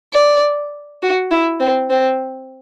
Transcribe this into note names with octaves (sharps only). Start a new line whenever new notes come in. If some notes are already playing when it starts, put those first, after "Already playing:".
D5
F#4
E4
C4
C4